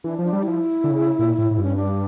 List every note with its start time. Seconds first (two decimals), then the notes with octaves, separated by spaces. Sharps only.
0.04 E3 D4
0.19 F3 D4
0.33 G3
0.43 F3 E4
0.84 D3
0.91 C#3
1.19 A#2
1.38 A2
1.51 A2
1.58 G2
1.63 C#4
1.76 D4